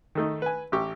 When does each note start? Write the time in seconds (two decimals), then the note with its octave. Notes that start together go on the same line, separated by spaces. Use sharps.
0.15 D#3 A3 D#4
0.42 B4 G#5
0.72 A1 G4 C#6